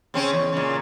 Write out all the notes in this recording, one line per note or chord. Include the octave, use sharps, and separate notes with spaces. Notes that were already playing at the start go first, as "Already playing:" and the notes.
C#3 C4 C#4
E2
A#2 C#3